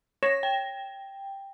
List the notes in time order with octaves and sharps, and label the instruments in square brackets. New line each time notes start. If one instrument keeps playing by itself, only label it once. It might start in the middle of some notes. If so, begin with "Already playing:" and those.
[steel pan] C#5 [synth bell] A#6 E7
[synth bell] G5